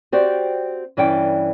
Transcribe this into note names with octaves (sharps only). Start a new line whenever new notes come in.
C4 F#4 G4 C5 D5
G2 E3 C#4 D5 G5